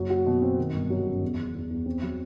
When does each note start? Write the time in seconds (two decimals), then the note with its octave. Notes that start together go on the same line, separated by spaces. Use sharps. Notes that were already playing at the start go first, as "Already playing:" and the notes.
Already playing: F#1 F#3
0.10 F#4
0.26 B2
0.42 C4
0.58 D#3
0.74 G1
0.90 F#3
1.06 F#2
1.21 E2
1.38 E2
1.55 E2
1.71 E2
1.86 C4
2.03 F#3